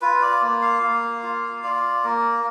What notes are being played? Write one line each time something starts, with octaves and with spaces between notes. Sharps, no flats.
F4 B4
D5
A#3
F5
A#3
F4
F4 D5
A#3 A#4